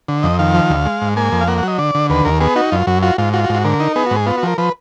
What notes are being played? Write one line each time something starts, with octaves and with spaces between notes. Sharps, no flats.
D3
F2 D#5
D#3 F5
F3
D2
G#3
G#2
A#3 G#5
F2
F5
A#3 F#5
F#5
F#3 D#5
D3 D5
D3
D#2 B4
D#2 A#4
B3 G#4
D#4 F#4
F#2 F4
F#2 F#4
F4 F#4
G#2 F4
F4 F#4
F#4
G#2
F#4
D3 A#4
D#4
B3 G#4
F#4
G#2
G#4
B3 F4
F#4
F3 A#4
F3 B4